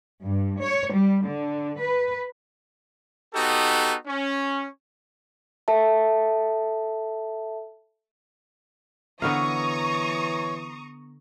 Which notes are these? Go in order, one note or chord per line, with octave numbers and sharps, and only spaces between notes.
G2
C#5
G3
D3
B4
B3 D#4 F#4 G4 A4
C#4
A4 E5 A5
D3 E3 B3 C#5 F5 A#5 C#6 D#6